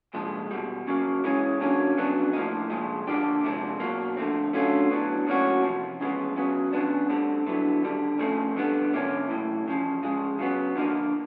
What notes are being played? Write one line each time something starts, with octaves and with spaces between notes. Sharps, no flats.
C2 A#2 F3 G#3
E2 B2 G3
C#3 F#3 A#3
C#2 C#3 E3 G#3 C#4
D3 F#3 A#3 C#4
F2 C#3 F#3 B3 D4
A2 F3 A#3 D#4
C2 A#2 F3 G#3
D3 F3 A#3 D4 G4
F2 C3 F3 G#3 C4
B2 F#3 A#3
D3 F3 A3 C4
D3 F#3 A3 C#4 F4
A2 F#3 B3 D4
A2 F#3 A#3 C#4 F#4
E2 C3 F3
E2 C#3 F3 G#3 B3
C#3 F#3 B3
C#3 F3 G#3 B3 D4
D2 D3 G3 C4
G2 D3 F#3 B3 E4
D#2 D3 G3
F2 C#3 F3 A3 C4
F2 D3 G3 B3
F2 C3 F3 A#3 C#4
B1 A2 E3
E2 C#3 F3
C#3 F3 G#3
C#3 F#3 B3
D3 F3 A#3 D#4